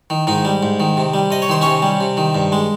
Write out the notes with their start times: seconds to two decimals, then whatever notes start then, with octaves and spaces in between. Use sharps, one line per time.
0.10 D#3
0.27 G#2 D#3 D#4
0.45 G3
0.63 G#2
0.80 D#3
0.97 C3
1.14 G3
1.31 C3 D#5
1.42 C#5
1.49 D#3 C5
1.61 C3 C#4 C#5
1.82 G3
2.01 C3
2.17 D#3
2.35 G2
2.52 G#3